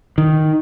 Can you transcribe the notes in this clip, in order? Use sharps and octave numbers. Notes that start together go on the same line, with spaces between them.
D#3